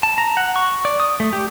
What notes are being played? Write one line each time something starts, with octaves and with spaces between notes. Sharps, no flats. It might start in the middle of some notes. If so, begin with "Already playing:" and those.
A5
A#5
F#5
C#6
D5
D#6
A3
G4